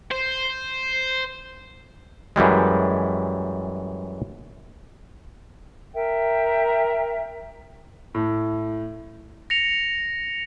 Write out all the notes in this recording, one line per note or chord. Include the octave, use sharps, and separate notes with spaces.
C5
F#2 E3 G3 G#3
A#4 E5 G5
A2
A#6 C#7 F7